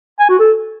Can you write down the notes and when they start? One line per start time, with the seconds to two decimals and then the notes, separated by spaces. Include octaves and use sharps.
0.19 G#5
0.29 F#4
0.39 A4